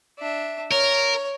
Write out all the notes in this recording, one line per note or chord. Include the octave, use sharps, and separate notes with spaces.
D4 E5
A#4 C#5